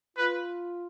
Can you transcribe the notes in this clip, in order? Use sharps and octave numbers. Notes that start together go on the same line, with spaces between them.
F4 B4